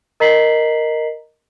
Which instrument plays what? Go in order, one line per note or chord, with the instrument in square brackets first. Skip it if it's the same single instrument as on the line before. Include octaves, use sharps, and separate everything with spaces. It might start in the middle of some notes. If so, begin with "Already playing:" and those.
[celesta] A#4 D#5 A#5 B6 C7 F#7